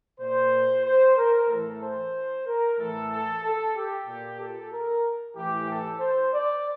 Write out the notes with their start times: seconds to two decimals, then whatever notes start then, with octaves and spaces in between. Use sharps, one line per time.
0.20 A#2 C5
0.85 C5
1.17 A#4
1.49 A2 E3 A4
1.82 C5
2.46 A#4
2.79 A2 E3 A4
3.11 A4
3.43 A4
3.76 G4
4.07 A#2
4.39 A4
4.72 A#4
5.36 A2 E3 G4
5.69 A4
6.00 C5
6.33 D5